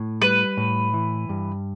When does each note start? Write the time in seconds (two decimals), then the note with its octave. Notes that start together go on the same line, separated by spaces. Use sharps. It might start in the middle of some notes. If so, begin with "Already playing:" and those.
Already playing: A2
0.22 G3 B4
0.57 A2
0.94 E3
1.29 G2